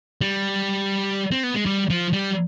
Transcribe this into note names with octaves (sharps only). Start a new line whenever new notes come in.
G3
C4
B3
G#3
G3
F3
G3